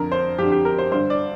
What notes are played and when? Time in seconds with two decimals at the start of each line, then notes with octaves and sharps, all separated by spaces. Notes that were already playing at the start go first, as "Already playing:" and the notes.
Already playing: F2 D3 A#4
0.12 C5
0.38 F2 D3 G4
0.52 G4
0.65 A#4
0.78 C5
0.91 G2 D3 C5
1.10 D5